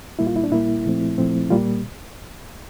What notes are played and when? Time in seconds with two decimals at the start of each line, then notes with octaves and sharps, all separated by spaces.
0.19 A#2 G3 A#3 E4
0.27 F4
0.36 E4
0.44 D4
0.52 A#2 G3 A#3 E4
0.85 A#2 F3 A3 C4
1.18 A#2 F3 A3 C4
1.51 A#2 G3 A#3 F4